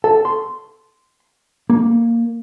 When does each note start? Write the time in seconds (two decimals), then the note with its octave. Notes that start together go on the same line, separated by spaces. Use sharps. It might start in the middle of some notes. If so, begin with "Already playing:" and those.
0.04 A4
0.25 C6
1.70 A#3